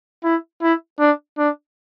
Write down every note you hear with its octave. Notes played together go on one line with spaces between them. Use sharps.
E4
E4
D4
D4